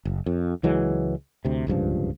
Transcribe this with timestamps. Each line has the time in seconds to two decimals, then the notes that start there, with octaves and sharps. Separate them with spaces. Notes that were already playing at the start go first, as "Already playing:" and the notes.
0.05 F#1
0.26 F2
0.63 C#2 E3 F#3 G#3
1.45 D2 C3
1.67 D1 C#2 G2 F3